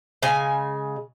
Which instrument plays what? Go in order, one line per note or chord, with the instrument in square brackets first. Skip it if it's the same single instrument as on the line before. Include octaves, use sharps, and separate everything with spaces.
[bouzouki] C#3 G#3 G#5